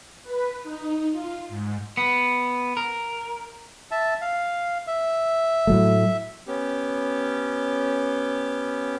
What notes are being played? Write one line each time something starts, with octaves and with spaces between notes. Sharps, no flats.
B4
D#4
F4
G#2
B3
A#4
E5 A5
F5
E5
A2 F#3 A3
B3 C#4 G4